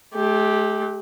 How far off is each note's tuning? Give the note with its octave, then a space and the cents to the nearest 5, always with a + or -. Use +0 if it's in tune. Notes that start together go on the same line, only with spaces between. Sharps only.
A3 -45 G4 +0